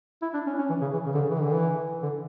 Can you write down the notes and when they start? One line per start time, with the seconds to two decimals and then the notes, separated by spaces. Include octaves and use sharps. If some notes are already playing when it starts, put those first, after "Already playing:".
0.22 E4
0.34 D4
0.47 C#4
0.59 C#4
0.69 E3
0.81 C#3
0.93 E3
1.06 C#3
1.14 D3
1.17 C#3
1.30 E3
1.41 D3
1.53 E3
2.03 D3